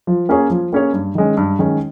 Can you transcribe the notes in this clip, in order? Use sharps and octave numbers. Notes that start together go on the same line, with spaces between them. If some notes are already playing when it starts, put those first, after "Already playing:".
F3
A#3 C#4 G#4 C#5
F3
A#3 C#4 G#4 C#5
G2
D#3 G#3 C#4
G2
D#3 G#3 C#4